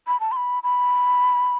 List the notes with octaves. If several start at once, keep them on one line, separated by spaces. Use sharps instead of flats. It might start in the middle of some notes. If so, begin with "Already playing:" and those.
B5
A5
C6
B5
B5